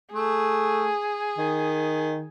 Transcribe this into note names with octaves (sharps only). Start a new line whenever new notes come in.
A3 G#4
D#3